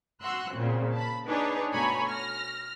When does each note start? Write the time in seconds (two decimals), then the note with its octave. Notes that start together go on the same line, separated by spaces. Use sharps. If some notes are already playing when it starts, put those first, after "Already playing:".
0.22 F#4 C6 E6 F#6
0.53 A#2 C#3 C4
0.92 A5 B5
1.27 D4 D#4 G#4 B4 C#5
1.73 B2 A3 C#5 G#5 A#5 B5
2.10 F6 A#6